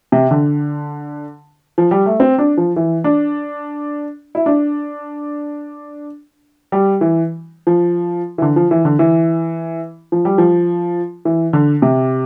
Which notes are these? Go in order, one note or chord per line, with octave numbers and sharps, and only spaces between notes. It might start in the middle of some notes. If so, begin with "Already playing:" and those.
C3
D3
F3
G3
A3
C4
D4
F3
E3
D4
E4
D4
G3
E3
F3
E3
D3
F3
E3
D3
E3
F3
G3
F3
E3
D3
C3